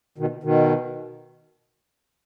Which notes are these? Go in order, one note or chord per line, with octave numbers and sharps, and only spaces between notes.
B2 D#3
B2 D#3